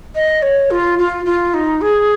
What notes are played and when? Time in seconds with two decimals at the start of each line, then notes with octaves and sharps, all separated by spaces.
0.14 D#5
0.42 C#5
0.70 F4
0.98 F4
1.25 F4
1.53 D#4
1.81 G#4